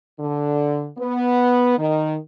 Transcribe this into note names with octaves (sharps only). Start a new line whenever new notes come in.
D3
B3
D#3